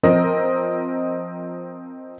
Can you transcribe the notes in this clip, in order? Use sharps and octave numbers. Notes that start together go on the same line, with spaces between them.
F3 C4 A#4 D#5